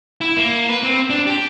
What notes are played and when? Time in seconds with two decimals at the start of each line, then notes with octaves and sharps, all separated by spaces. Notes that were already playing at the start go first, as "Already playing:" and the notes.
0.21 E4
0.37 A#3
0.69 B4
0.83 C4
1.10 D4
1.27 G4